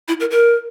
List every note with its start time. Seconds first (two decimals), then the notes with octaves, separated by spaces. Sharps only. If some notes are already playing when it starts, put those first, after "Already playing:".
0.08 E4
0.20 A#4
0.31 A#4